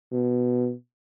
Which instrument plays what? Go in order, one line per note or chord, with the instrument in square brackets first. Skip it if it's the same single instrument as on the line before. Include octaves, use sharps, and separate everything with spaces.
[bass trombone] B2